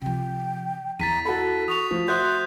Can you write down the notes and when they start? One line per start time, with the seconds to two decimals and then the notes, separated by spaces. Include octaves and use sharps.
0.02 C3 F3 G5
0.99 E2 E3 A#5 A6 B6 D#7
1.25 F#4 A4 B5
1.68 C#6 D#6 F7
1.91 F3 A3
2.08 F#4 C5 E5 C6 D#6 F#6 G6